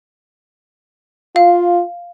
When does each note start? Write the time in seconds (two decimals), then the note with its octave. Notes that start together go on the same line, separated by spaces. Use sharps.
1.36 F4 F5